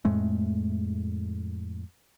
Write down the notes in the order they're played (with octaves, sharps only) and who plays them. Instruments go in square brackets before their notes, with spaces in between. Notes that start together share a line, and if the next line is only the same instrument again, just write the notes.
[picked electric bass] F2 A2 G#3 A3